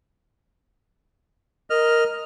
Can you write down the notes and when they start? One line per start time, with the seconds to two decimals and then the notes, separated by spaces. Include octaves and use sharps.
1.70 A#4 D#5 F6